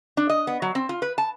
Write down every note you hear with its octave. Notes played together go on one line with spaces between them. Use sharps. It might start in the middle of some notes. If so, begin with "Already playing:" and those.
D4
D#5
B3
F#3
C4
F4
B4
A5